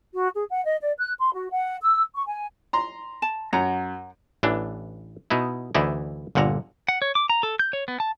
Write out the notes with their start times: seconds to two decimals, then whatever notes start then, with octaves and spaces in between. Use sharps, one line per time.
0.13 F#4
0.35 G#4
0.49 F#5
0.64 D#5
0.81 D5
0.97 F#6
1.18 C6
1.34 F#4
1.52 F#5
1.82 E6
2.14 C#6
2.27 G#5
2.73 A#5 C6
3.22 A5
3.53 F#2 C#5 F#5 A#5
4.43 A1 E3 D4
5.30 B2 B3 D#4 E4
5.75 D2 E3 D#4 E4 D5
6.35 G1 A#2 D3 F#5 A#5
6.88 F#5
7.02 C#5
7.15 D6
7.30 A#5
7.43 A4
7.59 G6
7.73 C#5
7.88 B3
8.00 A5